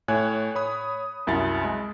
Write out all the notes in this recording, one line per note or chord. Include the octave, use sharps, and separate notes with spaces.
A2 C#5 G#5 F#6 G#6
C#5 B5 D#6
C2 F#2 E4 A6
G#3